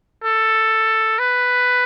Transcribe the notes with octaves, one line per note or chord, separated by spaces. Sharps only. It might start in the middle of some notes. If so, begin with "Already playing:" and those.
A4
B4